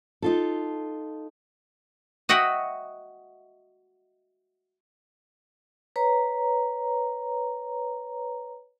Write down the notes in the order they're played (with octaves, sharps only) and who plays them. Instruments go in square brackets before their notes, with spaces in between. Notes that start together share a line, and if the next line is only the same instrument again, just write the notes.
[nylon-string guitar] D#4 F4 A4
[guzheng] F#4 D#5 E5 F#5 G5
[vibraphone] B4 C#5 A#5